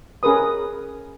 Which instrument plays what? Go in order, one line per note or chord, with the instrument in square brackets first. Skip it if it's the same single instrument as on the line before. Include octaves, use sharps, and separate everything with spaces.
[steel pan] C#4 G#4 A#4 B4 D#6